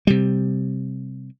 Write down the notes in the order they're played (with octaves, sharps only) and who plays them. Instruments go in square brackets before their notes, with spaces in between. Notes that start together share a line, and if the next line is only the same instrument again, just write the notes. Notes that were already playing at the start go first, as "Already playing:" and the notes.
[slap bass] C3 G3